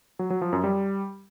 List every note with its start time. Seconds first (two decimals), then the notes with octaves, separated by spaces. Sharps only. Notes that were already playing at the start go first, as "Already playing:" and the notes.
0.19 F#3
0.30 F#3
0.41 F3
0.53 F#2
0.64 G3